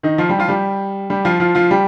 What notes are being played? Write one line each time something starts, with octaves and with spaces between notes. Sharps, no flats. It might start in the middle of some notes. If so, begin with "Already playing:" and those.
D#3 D#4
F3 F4
G3 G4
F3 F4
G3 G4
G3 G4
F3 F4
F3 F4
F3 F4
G3 G4